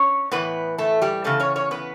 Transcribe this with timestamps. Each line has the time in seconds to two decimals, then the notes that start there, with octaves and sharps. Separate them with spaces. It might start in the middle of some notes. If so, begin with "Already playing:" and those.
Already playing: C#4 C#5
0.32 A2 E3 B3 B4
0.78 A3 A4
1.02 G3 G4
1.24 E2 C#3 E3 A3 A4
1.40 C#4 C#5
1.56 C#4 C#5
1.71 B3 B4